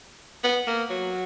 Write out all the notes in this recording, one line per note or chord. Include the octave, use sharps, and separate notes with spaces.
B3
A#3
F#3